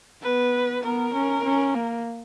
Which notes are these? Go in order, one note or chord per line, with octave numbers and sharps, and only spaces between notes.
B3 B4
B3 A#4
C#4
C#4
A#3